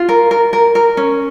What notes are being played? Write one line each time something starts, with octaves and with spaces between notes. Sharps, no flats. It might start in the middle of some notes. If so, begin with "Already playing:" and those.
Already playing: F4
A#4
A#4
A#4
A#4
C#4